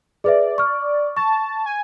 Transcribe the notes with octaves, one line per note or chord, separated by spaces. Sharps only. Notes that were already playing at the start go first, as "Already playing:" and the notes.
G#4 B4 D5 E5
C#6 F6
A5 C#6
G#5